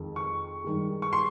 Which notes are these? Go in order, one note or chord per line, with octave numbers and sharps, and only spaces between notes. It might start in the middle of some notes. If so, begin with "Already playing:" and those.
Already playing: F2 D#3 G#3
C#6
G2 D#3 G#3
C#6
C6